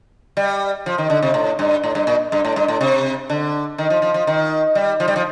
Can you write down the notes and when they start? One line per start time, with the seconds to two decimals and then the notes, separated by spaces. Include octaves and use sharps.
0.37 G3
0.86 F3
0.98 D#3
1.10 D3
1.23 C3
1.34 A2
1.59 G2
1.84 A2
1.95 G2
2.07 A#2
2.32 G2
2.45 A2
2.56 G2
2.68 A2
2.81 C3
3.30 D3
3.78 D#3
3.90 F3
4.02 F3
4.14 F3
4.27 D#3
4.75 G3
5.00 F3
5.08 G3
5.16 F3